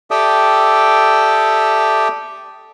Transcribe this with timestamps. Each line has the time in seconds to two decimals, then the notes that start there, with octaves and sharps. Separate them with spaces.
0.11 G4 A4 D5 E5 G5 D#6